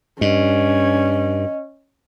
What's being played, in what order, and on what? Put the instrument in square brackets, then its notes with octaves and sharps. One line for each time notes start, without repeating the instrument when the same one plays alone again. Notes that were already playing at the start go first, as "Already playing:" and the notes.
[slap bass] G2 [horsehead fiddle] C#4 [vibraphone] D#5